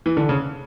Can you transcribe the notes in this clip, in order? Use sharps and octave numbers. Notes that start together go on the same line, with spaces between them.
E3
D3
C#3